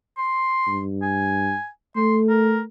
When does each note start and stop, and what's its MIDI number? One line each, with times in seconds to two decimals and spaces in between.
0.18 0.81 84
0.68 1.54 43
1.02 1.69 80
1.96 2.64 57
1.96 2.17 84
2.29 2.60 70